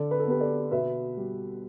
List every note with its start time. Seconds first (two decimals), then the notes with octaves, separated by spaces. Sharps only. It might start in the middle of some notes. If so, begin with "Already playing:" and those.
Already playing: D3 A4 D5
0.11 B4
0.20 A4
0.26 B3 G4 B4
0.40 A4 D5
0.71 B2 B4 E5
1.17 G3